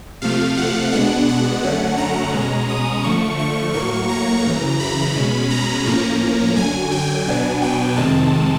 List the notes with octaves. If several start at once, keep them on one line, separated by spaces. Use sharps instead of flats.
C3 F3 A3 F5
F#5
B2 G#3 B3 D4 F#5
F#5
F#2 D3 F#3 A3 C#4
A#5
B2 G#3 C#4
D#6
D3 F3 A3 C#6
C#6
A2 F#3 A#3 C#6
A#5
F#2 C#3 E3
B5
B2 G#3 C#4
A#5
A2 F3 A#3 C#4 A#5
F#2 D3 F#3 G#5
G5
B2 F#3 B3 D4 G#5
G5
F2 C3 D#3 G#3 C4 A5